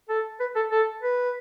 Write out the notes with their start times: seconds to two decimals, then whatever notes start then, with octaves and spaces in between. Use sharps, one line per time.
0.09 A4
0.40 B4
0.55 A4
0.71 A4
1.02 B4